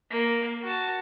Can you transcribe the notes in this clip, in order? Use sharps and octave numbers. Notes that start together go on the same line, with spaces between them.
A#3
F#4 A5